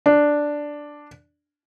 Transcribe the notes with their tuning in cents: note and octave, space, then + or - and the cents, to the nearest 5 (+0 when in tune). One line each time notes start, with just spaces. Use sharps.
D4 +0